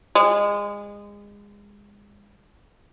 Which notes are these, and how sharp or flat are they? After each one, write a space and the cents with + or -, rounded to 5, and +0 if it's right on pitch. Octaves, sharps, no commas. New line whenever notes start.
G#3 -25